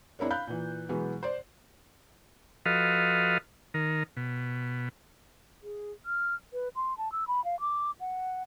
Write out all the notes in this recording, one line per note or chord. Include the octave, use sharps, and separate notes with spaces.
C4 D4 E4 A#4 C#5
F5 B5 F#6 G6
A#2 E3
B2 E3 F#3 G#3 B3
C5 D5
F3 F#4 A4 B4 D#5 F5
D#3 A#4
B2
G#4
F6
B4
C6
A5
E6
B5
F5
D6
F#5